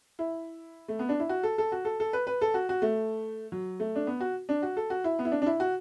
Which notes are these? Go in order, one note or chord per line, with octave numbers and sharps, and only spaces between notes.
E4
A3
B3
D4
E4
F#4
A4
A4
F#4
A4
A4
B4
B4
A4
F#4
F#4
A3
F#3
A3
D4
B3
F#4
D4
F#4
A4
F#4
E4
B3
E4
D4
D4
E4
F#4